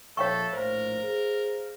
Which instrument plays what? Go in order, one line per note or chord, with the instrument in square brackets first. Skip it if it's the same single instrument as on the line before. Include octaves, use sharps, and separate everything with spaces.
[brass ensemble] A#1 [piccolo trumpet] A4 [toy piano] C#5 G5 C#6 [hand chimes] E5 F5 B6
[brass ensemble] A#1 A2 [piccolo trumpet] A#4 [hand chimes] C5 F5
[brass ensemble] G#4